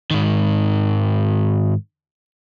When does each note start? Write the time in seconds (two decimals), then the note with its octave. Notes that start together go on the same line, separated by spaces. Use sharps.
0.11 G#2 D#3